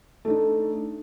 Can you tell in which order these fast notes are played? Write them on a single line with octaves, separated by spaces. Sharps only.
A3 D4 D#4